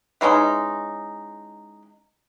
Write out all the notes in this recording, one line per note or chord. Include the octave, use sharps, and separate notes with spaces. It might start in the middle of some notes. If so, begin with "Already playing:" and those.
E3 G#3 C#4 D#4